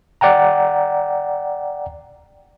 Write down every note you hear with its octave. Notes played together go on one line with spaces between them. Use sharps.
D5 F#5 G5 A#5